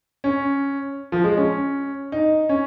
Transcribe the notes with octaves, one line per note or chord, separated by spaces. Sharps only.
C#4
F3
G#3
C#4
D#4
C#4